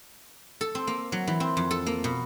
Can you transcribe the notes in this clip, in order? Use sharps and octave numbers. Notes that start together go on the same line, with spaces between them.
A4
C4
A#3
F#3
E3
C4
F2
A4
A#3
B2